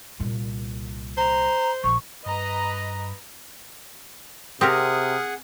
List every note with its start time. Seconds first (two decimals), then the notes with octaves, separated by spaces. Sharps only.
0.20 C2 A#2
1.17 C5 A#5
1.84 A#1 C#6
2.26 G2 B4 D#5 A#5
4.61 C3 C4 G4 G#4 A#4 F#5 D#6 F6